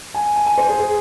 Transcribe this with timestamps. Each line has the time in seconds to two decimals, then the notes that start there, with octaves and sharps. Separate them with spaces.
0.14 G#5
0.36 G#5
0.46 G#5
0.58 C5
0.69 G#4
0.79 G#4